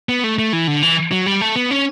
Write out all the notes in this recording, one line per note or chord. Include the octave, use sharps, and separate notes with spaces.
B3
A3
A3
E3
D3
E3
F#3
G3
A3
B3
C#4